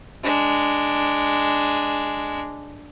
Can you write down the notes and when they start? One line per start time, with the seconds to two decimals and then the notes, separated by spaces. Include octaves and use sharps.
0.24 G#3 D4